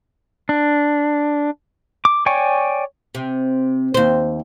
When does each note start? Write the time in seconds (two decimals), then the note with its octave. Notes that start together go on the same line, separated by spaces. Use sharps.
0.49 D4
2.05 D6
2.26 C#5 D5 G5 G#5 C#6
3.15 C3
3.94 D#2 C5